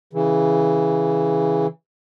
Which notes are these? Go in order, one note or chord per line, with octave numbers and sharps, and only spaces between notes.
C#3 E3